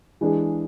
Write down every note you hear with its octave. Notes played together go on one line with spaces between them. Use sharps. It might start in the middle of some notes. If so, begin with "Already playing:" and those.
E3 G#3 D4 G#4